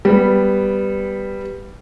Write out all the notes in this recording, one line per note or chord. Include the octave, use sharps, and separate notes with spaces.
G3 B3